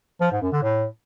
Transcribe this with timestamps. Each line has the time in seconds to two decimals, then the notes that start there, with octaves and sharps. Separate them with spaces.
0.21 F3
0.32 G#2
0.42 F#2
0.52 D3
0.63 A2